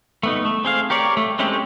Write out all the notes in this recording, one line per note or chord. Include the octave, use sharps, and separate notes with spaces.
A3 B3 D#4
A3
C4 G#4 F5
G4 A#4 C#5 D5
A3
G#3 A3 C4 C#4 G4